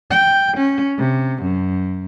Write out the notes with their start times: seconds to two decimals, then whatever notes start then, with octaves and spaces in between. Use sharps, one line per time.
0.10 G5
0.57 C#4
0.98 C3
1.42 F#2